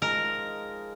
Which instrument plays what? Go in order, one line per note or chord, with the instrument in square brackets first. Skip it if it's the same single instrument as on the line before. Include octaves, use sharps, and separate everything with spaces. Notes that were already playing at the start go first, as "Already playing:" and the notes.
[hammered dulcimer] F3 G#3 D#4 [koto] A#4